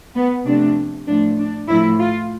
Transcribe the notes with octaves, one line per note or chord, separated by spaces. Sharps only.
B3
C3 F3 A3 D4
A2 F3 A3 D4
D4
A2 F3 A3 E4
F4